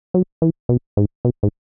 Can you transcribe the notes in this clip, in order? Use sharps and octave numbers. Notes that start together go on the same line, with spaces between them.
F#3
E3
B2
G#2
B2
G#2